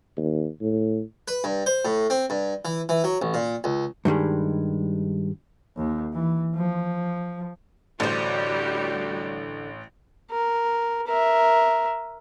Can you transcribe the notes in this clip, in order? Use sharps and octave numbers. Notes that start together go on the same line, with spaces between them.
D#2
A2
B4
G2
C5
A2
C4
G2
E3
E3
F#3
A1
A#2
C#2
G2 D#3 G3 G#3
D#2
E3
F3
A1 D3 G3 F#4 G4 C5
A#4
A#4 E5